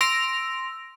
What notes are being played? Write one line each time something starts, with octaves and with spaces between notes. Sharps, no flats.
C6 E6 A#6 D7 F7